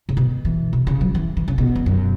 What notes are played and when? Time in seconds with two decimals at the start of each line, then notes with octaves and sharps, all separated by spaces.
0.09 C#3
0.17 B2
0.45 E3
0.73 B2
0.87 C#3
1.01 F#3
1.15 E3
1.37 E3
1.48 C#3
1.58 B2
1.75 E2
1.86 F#2